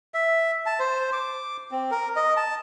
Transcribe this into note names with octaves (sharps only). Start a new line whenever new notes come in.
E5
A5
C5
D6
C4
A#4
D#5
A5